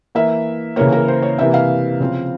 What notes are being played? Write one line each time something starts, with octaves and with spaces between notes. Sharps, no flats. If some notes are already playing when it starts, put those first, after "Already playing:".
E3 A#3 E5
C#3 E3 A#3 C#5
A#4
C5
C#5
C3 E3 A#3 E5
F5
C#3 F3 C4